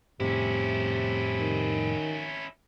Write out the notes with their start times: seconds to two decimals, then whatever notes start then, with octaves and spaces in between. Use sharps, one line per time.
0.20 F2 A2 C3 C#4 E4
1.39 D#3